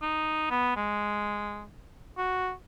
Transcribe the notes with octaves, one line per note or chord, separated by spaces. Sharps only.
D#4
B3
G#3
F#4